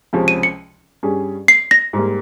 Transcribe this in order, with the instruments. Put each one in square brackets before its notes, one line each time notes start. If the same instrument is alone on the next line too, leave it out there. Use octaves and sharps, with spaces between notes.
[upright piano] C#2 C3 F3 G#3 C#4
[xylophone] D#7
C#7
[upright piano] G2 G3 C#4 G#4
[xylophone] C7
A#6
[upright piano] G#2 G3 A#3